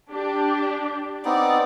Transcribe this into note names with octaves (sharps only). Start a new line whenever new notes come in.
D4 G4
B3 C4 D#4 D5